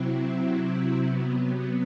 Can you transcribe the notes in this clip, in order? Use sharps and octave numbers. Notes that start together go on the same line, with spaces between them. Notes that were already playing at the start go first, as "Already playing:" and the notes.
Already playing: C3 F#3 C4 E4
C3 F#3 B3